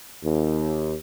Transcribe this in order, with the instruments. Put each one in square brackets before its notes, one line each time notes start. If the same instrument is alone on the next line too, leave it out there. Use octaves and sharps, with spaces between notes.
[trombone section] D#2